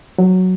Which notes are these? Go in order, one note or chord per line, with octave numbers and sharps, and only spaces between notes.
F#3